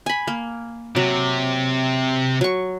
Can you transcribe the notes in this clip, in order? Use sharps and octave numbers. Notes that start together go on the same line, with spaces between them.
G#5 B5
A#3
C3 F#3
F#3 C#6